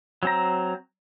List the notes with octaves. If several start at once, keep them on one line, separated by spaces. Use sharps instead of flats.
F#3 C4 A#5